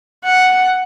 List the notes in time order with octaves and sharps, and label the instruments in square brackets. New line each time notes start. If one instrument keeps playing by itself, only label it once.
[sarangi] F#5